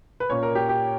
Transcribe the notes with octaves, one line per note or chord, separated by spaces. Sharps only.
B4
A#2 A#3 C#4 C#5
A#4
G4
G4